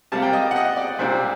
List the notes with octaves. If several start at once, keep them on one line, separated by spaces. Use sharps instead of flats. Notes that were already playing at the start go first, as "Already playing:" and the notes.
C3 G3 A#3 A5
G5
D#5
F#5
D#5
D5
C2 A#2 G3 D4 C5